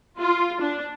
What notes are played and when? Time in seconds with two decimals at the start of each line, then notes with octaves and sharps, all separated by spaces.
0.20 F4
0.62 D4